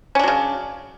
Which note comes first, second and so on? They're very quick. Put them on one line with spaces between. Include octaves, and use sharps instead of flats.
C#4 D4 F#3 C#3